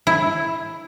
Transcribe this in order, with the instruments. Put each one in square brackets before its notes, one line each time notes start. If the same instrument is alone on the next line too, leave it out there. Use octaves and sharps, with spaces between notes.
[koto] E4